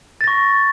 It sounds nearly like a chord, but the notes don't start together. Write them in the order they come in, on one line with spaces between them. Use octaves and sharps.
A6 A#6 C#6